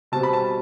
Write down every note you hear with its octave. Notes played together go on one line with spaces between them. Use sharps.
B2 G3 C4 A5
B5
A5